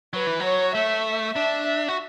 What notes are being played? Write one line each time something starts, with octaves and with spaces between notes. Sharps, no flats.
F#3 B4
E3
F#3 C#5
A3 E5
D4 E5
E5
F#4